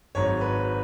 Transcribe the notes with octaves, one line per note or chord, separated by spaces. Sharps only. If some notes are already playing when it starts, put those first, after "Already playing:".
G#1 G#2 F#3 C#5
B4